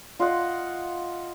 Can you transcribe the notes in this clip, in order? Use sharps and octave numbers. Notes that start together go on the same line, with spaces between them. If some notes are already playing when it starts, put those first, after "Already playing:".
F4 D#5 F#5